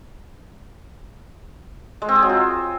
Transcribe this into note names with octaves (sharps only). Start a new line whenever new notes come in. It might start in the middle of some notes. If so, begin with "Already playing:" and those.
G#3
C4
G#4
F#3
F4